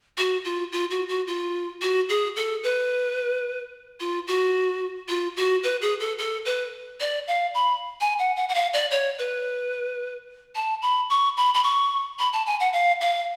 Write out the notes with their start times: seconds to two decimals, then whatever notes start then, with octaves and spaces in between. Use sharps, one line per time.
0.18 F#4
0.45 F4
0.72 F4
0.90 F#4
1.09 F#4
1.27 F4
1.82 F#4
2.09 G#4
2.36 A4
2.64 B4
4.00 F4
4.27 F#4
5.09 F4
5.37 F#4
5.63 B4
5.82 G#4
6.00 A4
6.19 A4
6.45 B4
7.00 D5
7.28 F5
7.54 B5
8.01 G#5
8.19 F#5
8.36 F#5
8.49 F#5
8.55 F5
8.73 D5
8.91 C#5
9.19 B4
10.55 A5
10.82 B5
11.10 C#6
11.37 B5
11.54 B5
11.64 C#6
12.19 B5
12.33 A5
12.46 G#5
12.60 F#5
12.73 F5
13.01 F5